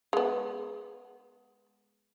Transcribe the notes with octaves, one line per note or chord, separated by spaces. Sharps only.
G#3 B3